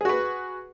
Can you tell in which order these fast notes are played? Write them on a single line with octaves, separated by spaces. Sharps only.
G#4 F#4 B4